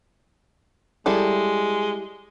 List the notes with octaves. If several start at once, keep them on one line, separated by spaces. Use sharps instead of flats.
G3 G#3 E4 A4